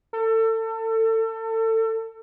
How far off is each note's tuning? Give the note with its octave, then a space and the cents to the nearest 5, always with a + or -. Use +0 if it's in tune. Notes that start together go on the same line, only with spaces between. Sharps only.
A4 +30